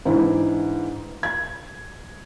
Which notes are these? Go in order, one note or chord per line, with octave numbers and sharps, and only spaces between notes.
G#2 E3 D4 E4
G#6